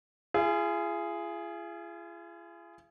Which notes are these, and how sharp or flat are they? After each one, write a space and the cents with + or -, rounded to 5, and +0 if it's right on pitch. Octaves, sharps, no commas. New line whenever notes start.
F4 -45 G#4 +0